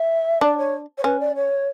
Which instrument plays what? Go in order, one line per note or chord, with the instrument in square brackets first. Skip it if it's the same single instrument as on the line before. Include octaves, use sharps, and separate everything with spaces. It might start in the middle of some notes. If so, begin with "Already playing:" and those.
Already playing: [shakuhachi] E5
[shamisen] D4 [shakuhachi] D5
[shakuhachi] C#5
C#5
[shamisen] C#4 [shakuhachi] B4
[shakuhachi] D5
C#5